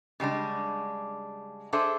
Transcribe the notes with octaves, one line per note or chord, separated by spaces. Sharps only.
C#3 G3 G#3 D4
D4 G#4 A4 C5 E5